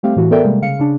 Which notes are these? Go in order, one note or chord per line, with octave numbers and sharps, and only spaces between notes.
G3 A3 C4 G4 F5
A2 E3 F#4
B3 A4 A#4 D5 E5 G5
C3 G3 G#3 A#3
C#3 F5 C#7
C#3 D4